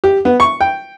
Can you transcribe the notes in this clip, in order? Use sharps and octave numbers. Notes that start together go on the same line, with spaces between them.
G4
B3
C#6
G5